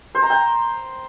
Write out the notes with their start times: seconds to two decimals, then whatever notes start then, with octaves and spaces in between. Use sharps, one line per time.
0.15 C5
0.22 A#5
0.30 G5